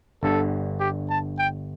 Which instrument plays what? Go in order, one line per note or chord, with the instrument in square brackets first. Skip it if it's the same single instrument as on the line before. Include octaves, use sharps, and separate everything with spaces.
[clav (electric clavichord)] G1 G2 D3 [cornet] A4
[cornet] G4
A5
G5